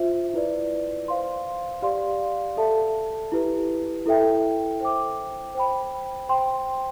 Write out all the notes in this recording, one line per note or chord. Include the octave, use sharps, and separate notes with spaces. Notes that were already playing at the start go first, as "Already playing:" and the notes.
Already playing: F4 C5 E5
E4 B4 D5
C5 F5 C6
G4 D5 F5 C6
A4 E5 A5
E4 G4 B4
E4 A4 E5 G5
C5 G5 D6
C5 G5 B5
C5 G5 C6